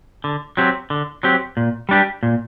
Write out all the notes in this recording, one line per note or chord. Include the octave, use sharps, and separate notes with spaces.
D3
F#3 C4 G4
D3
F#3 C4 G4
A#2
G3 D4 G4
A#2